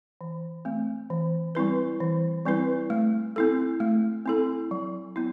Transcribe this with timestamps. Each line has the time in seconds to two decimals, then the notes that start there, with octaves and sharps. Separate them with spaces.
0.21 E3
0.65 A3 C4
1.10 E3
1.55 G3 C4 E4 B4
2.00 E3
2.45 G3 C4 E4 B4
2.90 A3
3.36 C4 E4 A4
3.80 A3
4.26 C4 E4 A4
4.71 F#3
5.16 B3 E4